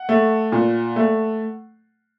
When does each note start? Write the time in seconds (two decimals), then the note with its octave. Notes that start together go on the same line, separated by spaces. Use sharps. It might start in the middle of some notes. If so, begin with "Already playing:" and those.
Already playing: F#5
0.09 A3
0.52 A#2
0.96 A3